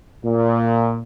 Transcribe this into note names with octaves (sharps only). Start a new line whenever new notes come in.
A#2